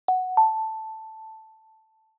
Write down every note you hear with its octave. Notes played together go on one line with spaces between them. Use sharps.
F#5
A5